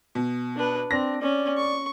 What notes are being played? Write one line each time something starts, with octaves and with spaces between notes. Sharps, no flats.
B2
D4 B4
C4 D4 A#6
C#4 D5
C#6